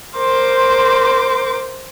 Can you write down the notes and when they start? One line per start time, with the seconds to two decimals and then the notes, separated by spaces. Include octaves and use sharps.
0.16 A#4 C5 C6 D6